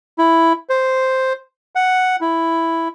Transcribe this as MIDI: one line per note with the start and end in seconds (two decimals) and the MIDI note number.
0.18 0.53 64
0.69 1.33 72
1.75 2.16 78
2.21 2.88 64